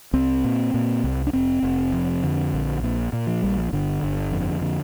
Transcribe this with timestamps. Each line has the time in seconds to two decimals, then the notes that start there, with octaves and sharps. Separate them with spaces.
0.13 C2 C4
0.44 A#2
0.74 A#2
1.04 C2
1.27 D4
1.33 F1 C4
1.63 F1
1.93 F2
2.23 D3
2.53 A#1
2.83 A#2
3.13 A#2
3.27 F3
3.42 A#1 G3
3.57 F3
3.73 G1 D3
4.03 G1
4.32 F2
4.62 D3